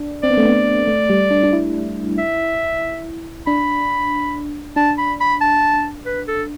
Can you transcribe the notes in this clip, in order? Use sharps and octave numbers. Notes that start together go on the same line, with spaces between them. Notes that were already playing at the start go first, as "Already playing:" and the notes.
Already playing: D4
C4 D5
B3
A3
B3
A3
G3
D4
D4
E4
E5
D4 B5
D4 A5
B5
B5
A5
B4
A4